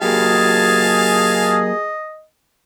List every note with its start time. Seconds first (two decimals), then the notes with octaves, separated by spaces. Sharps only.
0.02 F#3 A#3 G4 G#4 D#5 F5 G#5 A5